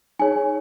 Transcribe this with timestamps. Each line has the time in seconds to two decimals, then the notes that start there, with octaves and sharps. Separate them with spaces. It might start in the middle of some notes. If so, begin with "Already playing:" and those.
0.19 D#4 G#4 C#5 G#5